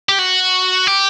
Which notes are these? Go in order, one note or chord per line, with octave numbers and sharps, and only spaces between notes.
G4
F#4
G4